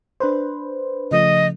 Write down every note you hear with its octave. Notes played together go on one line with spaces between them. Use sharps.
D4 B4 C5
C#3 F3 A3 D#5